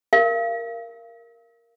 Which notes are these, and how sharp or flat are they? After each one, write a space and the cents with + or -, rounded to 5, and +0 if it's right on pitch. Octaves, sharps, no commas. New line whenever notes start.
A#4 +0 F5 -30